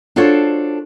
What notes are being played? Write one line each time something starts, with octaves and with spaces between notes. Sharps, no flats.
D4 F4 F#4 A4 C5 C#5